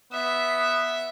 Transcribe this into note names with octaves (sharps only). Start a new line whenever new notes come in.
B3 E5